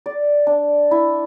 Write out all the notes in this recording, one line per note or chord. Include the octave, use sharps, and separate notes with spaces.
D5
D4
E4